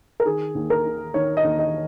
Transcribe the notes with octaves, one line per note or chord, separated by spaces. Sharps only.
A#4
D#3 G#4
D#2
A#4
D#3
D#3 C#5
D#5
D#2
D#5